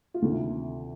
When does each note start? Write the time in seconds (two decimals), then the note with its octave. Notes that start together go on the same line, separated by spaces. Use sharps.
0.14 F4
0.22 D2 C3 D#3 E4